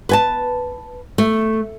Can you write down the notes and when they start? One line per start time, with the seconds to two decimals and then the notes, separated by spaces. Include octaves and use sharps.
0.09 B4 G#5 A5
1.18 A3